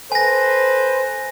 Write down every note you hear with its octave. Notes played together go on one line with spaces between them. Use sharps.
A4 B4 C5 G#5 A#6